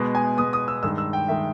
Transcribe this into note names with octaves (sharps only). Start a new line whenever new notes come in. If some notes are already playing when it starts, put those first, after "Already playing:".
Already playing: B2 G#3 B3
G#5
B2 G#3 B3 D#6
D#6
E6
G2 D#3 G#3 E6
E6
G5
D#3 G#3 E5